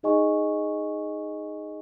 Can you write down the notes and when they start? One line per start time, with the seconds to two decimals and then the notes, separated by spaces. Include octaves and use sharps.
0.03 D#4 G#4 D#5 G#5 C#6